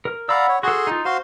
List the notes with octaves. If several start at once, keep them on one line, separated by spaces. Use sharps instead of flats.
A#4
D5 F5 F#5 A#5 B5 E6
C#5
F#4 G#4 A4 C6
D#4 F4
F#4 C5 F5 C6